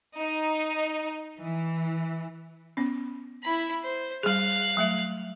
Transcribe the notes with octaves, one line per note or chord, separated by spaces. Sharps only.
D#4
E3
B3 C#4
E4 B5
C5
G3 G#4 F5 F#6
F#3 A3 E5